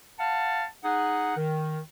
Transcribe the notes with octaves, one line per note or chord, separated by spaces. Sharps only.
F5 F#5 A5
D#4 G#4 F#5
D#3